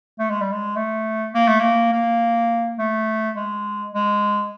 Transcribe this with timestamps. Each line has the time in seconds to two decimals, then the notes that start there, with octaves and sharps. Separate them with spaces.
0.19 A3
0.30 G#3
0.41 G3
0.52 G#3
0.76 A3
1.34 A#3
1.48 A3
1.60 A#3
1.92 A#3
2.79 A3
3.36 G#3
3.94 G#3